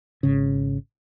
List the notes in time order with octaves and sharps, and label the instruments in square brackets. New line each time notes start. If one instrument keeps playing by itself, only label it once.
[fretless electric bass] G#1 C#3